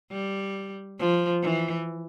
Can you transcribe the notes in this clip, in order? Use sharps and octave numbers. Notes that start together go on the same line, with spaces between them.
G3
F3
E3